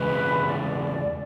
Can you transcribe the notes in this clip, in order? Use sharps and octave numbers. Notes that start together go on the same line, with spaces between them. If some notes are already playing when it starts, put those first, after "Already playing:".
Already playing: E2 C#3 G#3 B4
D5